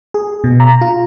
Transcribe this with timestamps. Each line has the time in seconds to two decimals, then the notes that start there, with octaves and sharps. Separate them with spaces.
0.14 G#4
0.44 B2
0.60 A#5
0.81 F4